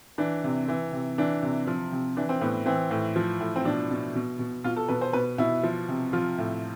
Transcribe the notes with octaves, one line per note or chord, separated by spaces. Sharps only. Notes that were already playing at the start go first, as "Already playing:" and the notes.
E3 D4
C3
E3
C3
E3 D4
C3
F3
C3
E3 D4
C4
A2 B3
E3 C4
A2
F3
A2
C4
B2 D4
B2
B2
B2
B2 F4
A4
B2 B4
C5
B2 B4
B2 E4
F3
C3
F3 F4
A2